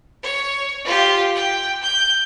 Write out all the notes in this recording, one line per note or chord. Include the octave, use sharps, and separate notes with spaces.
C#5
F4 G4
G5
G6